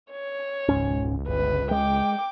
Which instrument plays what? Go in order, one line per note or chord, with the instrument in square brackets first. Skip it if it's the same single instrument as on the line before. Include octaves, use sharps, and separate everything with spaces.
[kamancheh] C#5
[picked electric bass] E1 G#2 C#4 [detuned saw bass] C#2
[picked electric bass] G1 [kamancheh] B4
[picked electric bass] G#3 [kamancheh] G5 D6